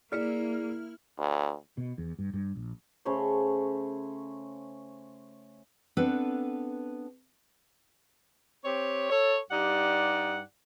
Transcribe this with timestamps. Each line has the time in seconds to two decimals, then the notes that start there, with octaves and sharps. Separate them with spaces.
0.12 A#3 E4 G#4 D5 F6 C#7
1.18 D2
1.78 B2
1.98 E2
2.19 G2
2.33 G2
2.56 A#1
3.05 C#3 A3 C5 C#5
5.97 B3 C4 D4 A4 B4
8.65 C4 G4 C#5
9.10 A4 C#5
9.51 G2 D#4 G4 D5 F#5